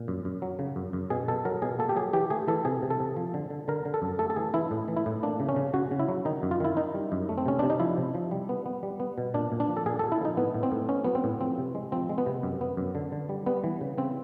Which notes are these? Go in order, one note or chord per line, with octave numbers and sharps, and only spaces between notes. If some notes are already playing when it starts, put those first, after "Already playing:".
Already playing: A#2
F#2
F#2
F#3
C#3
F#2
F#2
B2 G#4
B2 A4
F#3 A#4
B2 G#4
A#3 A4
G4
F#3 G#4
E3 G4
A3 G#4
E3 A4
C3 G#4
C3
A4
C3
F3
D3
D3
D3 A#4
D3
A4
F#2
A3 A4
A4
E3 G#4
E3 E4
A2
E3
E4
A2
A#3 D4
C#3
C#4
C#3
C#3 F#4
C#3
E4
F#3
D#3 D#4
F#2
F4
D#3 E4
D#3 D#4
G3
F#2
A3
C4
C3 C#4
C3 D4
D#4
F3 E4
C3
F3
G3
B3
B3
G3
B3
B2
A#2 D4
A#2
D4
F3
A4
A#2 G#4
A#2 A4
E4
F3 D#4
A2 B3
A2
C4
A2
B3 C#4
F#3 B3
C4
A2
F3 C4
C3
G#3
F3 C4
G#3
B3
C3
F#2
B3
F#2
D3
D3
G3
G3 B3
E3
C#3
C#3 C4